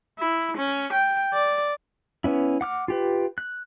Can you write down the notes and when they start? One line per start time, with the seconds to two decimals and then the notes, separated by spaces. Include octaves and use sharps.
0.19 E4
0.57 C#4
0.93 G5
1.34 D5
2.24 B3 C#4 E4
2.61 F#5 D6 F6
2.88 F4 G4 B4
3.38 F#6